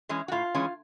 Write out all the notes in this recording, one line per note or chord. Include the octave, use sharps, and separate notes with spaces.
E3 G#3 C#4
F#4
A2 F4
E3 G#3 C#4